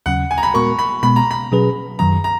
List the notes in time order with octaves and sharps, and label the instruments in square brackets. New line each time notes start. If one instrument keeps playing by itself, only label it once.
[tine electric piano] D#2 C#3 F#3 C#4 [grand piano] F#5
[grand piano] G#5
A#5
B5
[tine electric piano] A#2 G#3 B3 F#4 A#4 [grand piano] C#6
[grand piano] B5
[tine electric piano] B2 G#3 B3 [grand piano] B5
[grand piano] A#5
B5
[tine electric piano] B2 F#3 C#4 G#4 B4
[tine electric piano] F#2 D#3 F#3 [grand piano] A#5
[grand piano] A#5